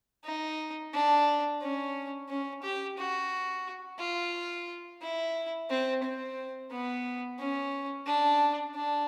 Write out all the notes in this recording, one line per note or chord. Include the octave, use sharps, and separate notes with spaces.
D#4
D4
C#4
C#4
G4
F#4
F4
E4
C4
C4
B3
C#4
D4
D4